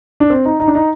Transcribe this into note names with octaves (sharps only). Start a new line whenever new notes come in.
D4
C4
D#4
D#4
D4
D#4